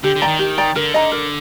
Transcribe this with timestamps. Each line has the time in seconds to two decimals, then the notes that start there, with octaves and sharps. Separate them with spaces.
0.04 D3 G4
0.16 D3
0.21 D5 G5 A#5
0.28 D#3
0.39 G4
0.58 D5 G5 A#5
0.76 D3 A#4
0.94 D#5 A#5
1.12 A#4